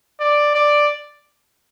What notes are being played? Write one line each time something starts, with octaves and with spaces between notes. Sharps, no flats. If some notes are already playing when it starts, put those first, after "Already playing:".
D5
D5